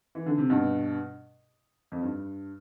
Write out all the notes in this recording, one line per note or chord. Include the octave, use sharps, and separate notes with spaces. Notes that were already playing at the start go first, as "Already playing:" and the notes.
E3
D3
C3
G2 B2
F2
G2